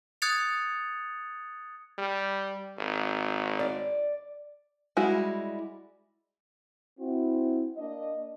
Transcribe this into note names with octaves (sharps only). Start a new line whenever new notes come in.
D#6 F#6 G#6 A6 C#7 F7
G3
G#1
D5
G3 G#3 E4 F#4
C4 E4 F#4
A#3 D4 D5 D#5